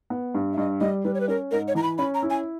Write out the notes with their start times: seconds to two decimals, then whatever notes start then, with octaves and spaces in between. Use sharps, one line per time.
0.10 B3
0.34 G2
0.53 E5
0.58 G2 D#5
0.81 G3 D#5
1.04 G3 B4
1.14 C#5
1.20 B4
1.28 C#4 A#4
1.51 G#2 A#4
1.68 C#5
1.75 E3 A#5
1.83 B5
1.98 C#4 B5
2.15 A#5
2.22 E4
2.30 G#5